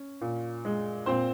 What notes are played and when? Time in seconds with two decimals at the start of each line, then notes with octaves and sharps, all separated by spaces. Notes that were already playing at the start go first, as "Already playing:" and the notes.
Already playing: C#4
0.21 A#2
0.65 G#3
1.06 A#2 C4 C5